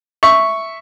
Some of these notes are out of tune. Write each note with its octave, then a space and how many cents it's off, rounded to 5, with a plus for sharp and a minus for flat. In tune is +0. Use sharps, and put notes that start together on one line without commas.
E5 +0 C#6 +0